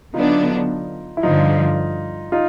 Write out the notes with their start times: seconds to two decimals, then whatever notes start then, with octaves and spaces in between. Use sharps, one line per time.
0.14 D3 F#3 B3 D4 D#4 F4
1.17 E4
1.23 G2 D3 F3 D#4 F4
2.32 D#4 F4